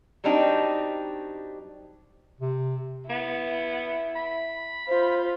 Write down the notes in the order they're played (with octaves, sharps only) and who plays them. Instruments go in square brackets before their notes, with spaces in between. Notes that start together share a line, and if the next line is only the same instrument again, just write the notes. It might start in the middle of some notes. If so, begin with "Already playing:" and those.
[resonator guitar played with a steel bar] F#3 G3 C4 D4 D#4 G4
[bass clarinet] C3
[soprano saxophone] B3 [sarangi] E4
[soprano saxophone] B5
[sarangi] F4 [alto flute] C5